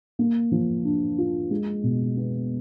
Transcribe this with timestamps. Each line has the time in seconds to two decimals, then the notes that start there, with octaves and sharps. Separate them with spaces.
0.19 A#3
0.52 F3
0.84 D4
1.18 F4
1.51 G#3
1.83 B2
2.17 B3